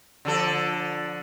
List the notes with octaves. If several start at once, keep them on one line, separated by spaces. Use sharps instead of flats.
D3 F3 A4